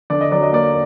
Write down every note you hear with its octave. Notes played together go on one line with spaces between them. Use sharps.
D3 D5
D#5
F#3 D5
D#5
A#3 D5